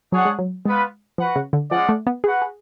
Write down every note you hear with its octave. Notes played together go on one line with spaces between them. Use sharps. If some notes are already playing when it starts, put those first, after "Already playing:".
F#3 D4 G#4 C#5 F#5
G#3
F#3
G#3 B3 F4 B4
F3 F#4 B4 F#5
C#3
D3
F3 G#3 C#4 G#4 D5 F#5
A3
B3
F#4 G#4 B4 F#5
G#4